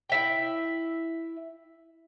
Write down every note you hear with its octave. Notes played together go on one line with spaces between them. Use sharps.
E4 E5 G5